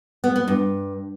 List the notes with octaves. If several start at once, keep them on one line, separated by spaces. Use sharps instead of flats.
B3
B3
G2